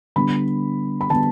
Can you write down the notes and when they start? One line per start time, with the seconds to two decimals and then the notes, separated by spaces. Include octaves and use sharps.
0.16 D3 G3 B3 B5
1.01 B5
1.09 D3 G3 B3 A5